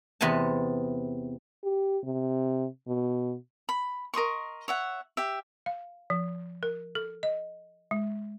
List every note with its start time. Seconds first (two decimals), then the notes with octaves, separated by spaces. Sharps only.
0.21 E2 C3 B3 G#5 A5
1.64 G4
2.03 C3
2.88 B2
3.69 B5
4.14 A#4 D#5 C6 C#6
4.68 C#5 E5 F#5
5.17 G4 E5
5.66 F5
6.10 F3
6.63 A#4
6.95 A4
7.23 D#5
7.91 G#3